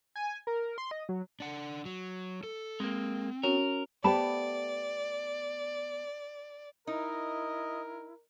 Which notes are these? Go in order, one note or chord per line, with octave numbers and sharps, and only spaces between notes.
G#5
A#4
C6
D#5
F#3
D4 F#5
F#3
A4
G#3 A#3 C4
C#4 F#4 A#4 C#5
A3 B3 G4 C5 D5 A5 B5
D#4 E4 A#4 D#5